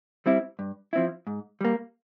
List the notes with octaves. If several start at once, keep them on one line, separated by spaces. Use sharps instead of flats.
G3 C4 E4
G2
F3 C4 E4
G#2
G3 A#3